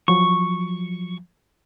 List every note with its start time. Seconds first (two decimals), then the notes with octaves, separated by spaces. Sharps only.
0.08 F3 F#3 C#6